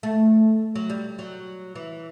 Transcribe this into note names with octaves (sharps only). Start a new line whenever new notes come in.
A3
F#3
G3
F#3
E3